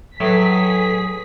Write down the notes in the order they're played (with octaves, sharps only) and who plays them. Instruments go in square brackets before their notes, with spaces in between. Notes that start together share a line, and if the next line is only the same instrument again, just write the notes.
[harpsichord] A2 [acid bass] F#3 [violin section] G#4 B6 [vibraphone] B4 D#6